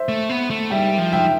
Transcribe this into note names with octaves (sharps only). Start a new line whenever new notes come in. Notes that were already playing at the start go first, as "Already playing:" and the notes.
Already playing: C5 E5
A3
B3
A3
G3 E5 G5
F3
E5 G5